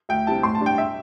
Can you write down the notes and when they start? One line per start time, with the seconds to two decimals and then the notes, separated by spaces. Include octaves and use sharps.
0.09 D2 G5
0.27 C3 G3 E4 A5
0.43 A2 C6
0.55 A5
0.61 G3 D4
0.66 G5
0.78 E5